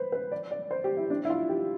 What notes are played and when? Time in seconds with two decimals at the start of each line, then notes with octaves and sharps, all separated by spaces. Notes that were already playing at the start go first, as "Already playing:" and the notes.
Already playing: B4 C5
0.12 B4
0.32 D5
0.51 D5
0.71 C5
0.84 G4
0.97 E4
1.10 D4
1.25 E4
1.30 F4
1.49 G4